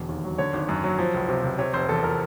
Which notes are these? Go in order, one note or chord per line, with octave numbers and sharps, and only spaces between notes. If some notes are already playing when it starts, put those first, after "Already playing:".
Already playing: E1 E2 D3
D#2
F#3
D3 C#5
G#1
F#2
F#3
F3
C#2
C3
C#2
C3 C#5
F1 C5
E2 A4
F3 A#4